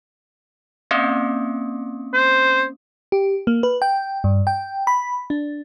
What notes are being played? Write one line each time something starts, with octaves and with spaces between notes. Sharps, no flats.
A#3 C4 C#4
C5
G4
A#3
B4
G5
G2
G5
B5
D4